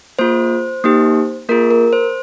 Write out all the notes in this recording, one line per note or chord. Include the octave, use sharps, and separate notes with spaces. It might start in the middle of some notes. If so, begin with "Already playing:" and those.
A#3 F4 G#4 C5
A#3 D#4 G4
A#3 F4 G#4 A#4
A#4
C5